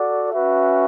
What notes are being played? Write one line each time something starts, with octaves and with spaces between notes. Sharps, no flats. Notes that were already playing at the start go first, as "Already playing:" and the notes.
Already playing: F#4 A4 D5 F#5
C#4 F#4 B4 E5